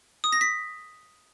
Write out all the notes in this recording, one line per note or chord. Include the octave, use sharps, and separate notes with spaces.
D#6
A#6
B6